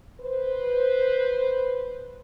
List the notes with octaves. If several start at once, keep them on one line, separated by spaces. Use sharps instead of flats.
B4 C5